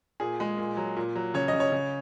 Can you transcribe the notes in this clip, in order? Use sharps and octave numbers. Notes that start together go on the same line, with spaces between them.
A#2 G#4
G#3
A#2
F#3
A#2
F#3
C#3 C#5
D#5
C#3
C#5
C#3